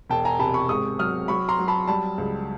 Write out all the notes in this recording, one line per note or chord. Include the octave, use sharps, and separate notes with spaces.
E1 G5 A5
G#5 A#5
C3 A5 B5
B5 C#6
G#2 C#6 D#6
F#3 D#6 F6
F#3 B5 C#6
A#5 C6
F#3
A5 B5
G3 A5 B5
C#2